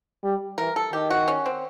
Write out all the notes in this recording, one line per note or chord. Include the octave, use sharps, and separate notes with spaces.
G3
E3 A#4
A4
D#3 G4
F#4
C#4
C4